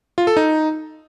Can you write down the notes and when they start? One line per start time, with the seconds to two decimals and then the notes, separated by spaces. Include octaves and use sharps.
0.18 F4
0.27 A4
0.37 D#4